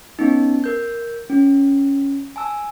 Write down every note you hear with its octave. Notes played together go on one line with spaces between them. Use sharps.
B3 C#4 D#4
A#4 G6
C#4
G#5 A5 E6